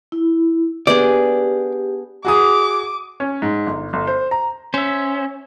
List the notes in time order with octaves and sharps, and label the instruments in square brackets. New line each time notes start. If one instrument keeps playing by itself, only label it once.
[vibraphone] E4
[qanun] B3 D4 G#4 [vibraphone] G4 [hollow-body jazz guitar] D5
[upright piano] F#4 G#4 D#6 [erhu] D6
[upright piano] C#4
G#2
G1
G1
C5
A#5
[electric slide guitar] C#4 [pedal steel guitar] C5 E5